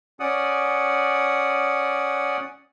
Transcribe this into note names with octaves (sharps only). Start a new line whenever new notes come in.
C#4 D5 F#5 D#6